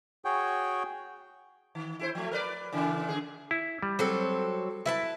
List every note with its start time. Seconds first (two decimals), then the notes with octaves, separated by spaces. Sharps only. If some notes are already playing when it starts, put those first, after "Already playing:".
0.25 F#4 G#4 C#5 G5
1.75 D#3
1.99 E4 G#4 C5
2.15 F3 A3
2.31 A#4 B4 D5
2.72 A#2 C#3 E3
3.09 D3 E3 G#4
3.51 E4
3.83 G3
3.99 F#3 C4 A4
4.86 E4 B4 A5